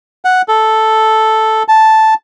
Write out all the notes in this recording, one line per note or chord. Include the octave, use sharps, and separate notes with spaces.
F#5
A4
A5